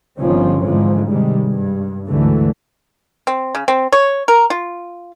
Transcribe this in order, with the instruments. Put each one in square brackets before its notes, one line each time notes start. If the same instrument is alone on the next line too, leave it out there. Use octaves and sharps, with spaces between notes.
[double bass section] G1 D3 D#3 F3 C4 C#4
G#2 D3 E3 F3 G#3
C3 D#3 G3 G#3
G2
D2 G#2 D3 E3 A3
[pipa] C4
C#3
C4
C#5
A#4
F4